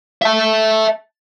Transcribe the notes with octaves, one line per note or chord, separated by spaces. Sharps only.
E5 A5